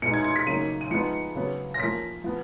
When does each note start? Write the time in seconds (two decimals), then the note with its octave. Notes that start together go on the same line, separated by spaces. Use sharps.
0.02 B2 G#3 D#4 C#7
0.14 G#6
0.24 G#6
0.36 B6
0.46 C#3 F#3 A#3 D#4 D#7
0.81 D#7
0.91 F3 G#3 B3 D#4 C#7
1.35 C#3 F#3 B3
1.74 A#6
1.79 F3 A#3 C#4 B6
2.24 F3 B3